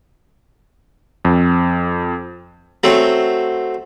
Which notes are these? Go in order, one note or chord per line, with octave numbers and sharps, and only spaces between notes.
F2
F#3 A3 C4